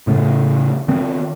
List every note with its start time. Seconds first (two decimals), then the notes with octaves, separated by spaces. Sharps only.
0.07 A2 C#3 A3
0.88 D#3 B3 C4